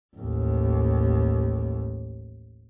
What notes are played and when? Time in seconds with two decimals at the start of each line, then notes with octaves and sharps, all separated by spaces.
0.16 A1 D#2